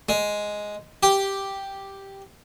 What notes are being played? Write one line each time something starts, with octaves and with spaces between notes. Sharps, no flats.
G#3
G4